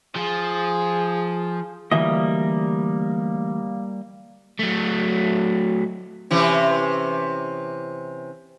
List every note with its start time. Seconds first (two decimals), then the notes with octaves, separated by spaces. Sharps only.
0.16 F3 G#4
1.91 D2 E3 G3 A#3 D#5 E5
4.59 F#3 A3
6.31 C3 E3 C#4